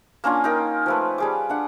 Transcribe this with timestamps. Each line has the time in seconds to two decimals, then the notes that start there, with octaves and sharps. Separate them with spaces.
0.24 A#3 C#4 D4 F4
0.44 D#4 A#4 G5
0.86 F3 A3 B4
1.18 G3 G#4 D6
1.50 D4 F#5